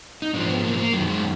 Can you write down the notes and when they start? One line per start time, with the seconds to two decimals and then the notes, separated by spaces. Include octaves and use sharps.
0.22 D#4
0.33 G#2 F3 D4
0.49 B3
0.64 A#3
0.78 A#3
0.93 F#2 D#3 F#3
1.08 G#3